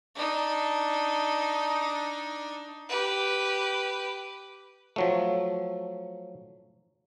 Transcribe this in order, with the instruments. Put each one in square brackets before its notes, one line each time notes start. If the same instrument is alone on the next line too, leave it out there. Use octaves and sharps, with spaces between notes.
[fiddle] D4 D#4
G4 B4
[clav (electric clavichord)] F3 F#3 A3